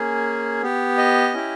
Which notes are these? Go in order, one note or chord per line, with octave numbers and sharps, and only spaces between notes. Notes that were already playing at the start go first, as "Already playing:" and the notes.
Already playing: A#3 C#4 G#4
B3 G4
D#5
C#4 E4 G4